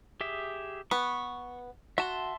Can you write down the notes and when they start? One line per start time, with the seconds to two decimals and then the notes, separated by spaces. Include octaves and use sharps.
0.21 G4 G#4 E5
0.91 B3 B4 C#6
1.98 F#4 E5 A5 C6